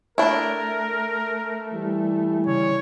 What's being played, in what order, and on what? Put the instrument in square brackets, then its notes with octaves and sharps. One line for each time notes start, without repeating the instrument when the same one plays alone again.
[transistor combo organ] A3 [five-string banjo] D4 E4 [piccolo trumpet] A#4
[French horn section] E3 G3
[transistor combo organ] C#3 [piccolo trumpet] C#5